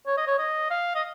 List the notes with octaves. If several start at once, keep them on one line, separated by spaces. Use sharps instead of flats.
C#5
D#5
C#5
D#5
F5
D#5